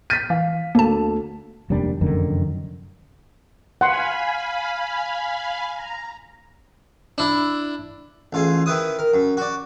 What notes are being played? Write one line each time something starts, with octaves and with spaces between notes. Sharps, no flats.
F6 G6 A6 B6 D#7
E3 F5
D2 A#3 A4 A5
F1 D#2 G3 D4
F1 F#2 D3 D#3
F5 F#5 G#5 B5 C6
A#5
D4 E4
A1 F4 G#4
D#3 E4 B4 D#6
A#4
F#2
F#4 D5